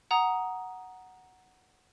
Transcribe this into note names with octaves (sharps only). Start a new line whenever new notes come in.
F#5 A#5 D#6